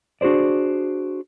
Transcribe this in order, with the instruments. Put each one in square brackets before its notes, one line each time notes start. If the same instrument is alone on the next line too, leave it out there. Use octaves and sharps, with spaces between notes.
[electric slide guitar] D4 F#4 G#4 C5 D5